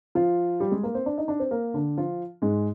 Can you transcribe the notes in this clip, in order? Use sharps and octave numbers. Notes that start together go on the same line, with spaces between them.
F3 F4
G3 G4
G#3 G#4
A#3 A#4
C4 C5
D4 D5
D#4 D#5
D4 D5
C4 C5
A#3 A#4
D3 D4
F3 F4
G#2 G#3